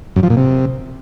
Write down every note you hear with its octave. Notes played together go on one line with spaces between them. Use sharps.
F#2
F3
A#2
C3